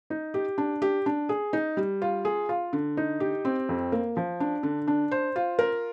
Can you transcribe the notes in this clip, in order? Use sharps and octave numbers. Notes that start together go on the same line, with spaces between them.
D#4
G4
D4
G4
D4
G#4
D#4
G3
F4
G#4
F4
D3
D#4
G4
C4
F2
A#3
F3
D4
D3
D4
C5
F4
A#4